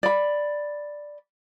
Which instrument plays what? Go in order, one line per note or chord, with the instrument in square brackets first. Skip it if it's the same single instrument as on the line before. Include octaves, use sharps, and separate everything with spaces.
[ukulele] D5 B5